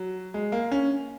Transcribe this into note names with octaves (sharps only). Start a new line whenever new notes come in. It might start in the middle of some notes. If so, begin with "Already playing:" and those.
Already playing: F#3
G#3
A#3
C#4